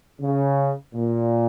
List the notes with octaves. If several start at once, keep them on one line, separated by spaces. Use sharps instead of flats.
C#3
A#2